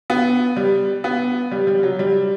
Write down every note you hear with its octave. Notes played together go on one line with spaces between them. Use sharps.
B3
G3
B3
G3
G3
F#3
G3